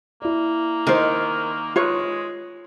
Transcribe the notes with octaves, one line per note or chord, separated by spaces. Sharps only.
A#3 E4 D5
D#3 A#4 C5
G#3 F4 B4 C#5